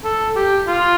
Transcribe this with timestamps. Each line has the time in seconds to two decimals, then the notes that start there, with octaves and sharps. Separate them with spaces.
0.04 A4
0.36 G4
0.67 F4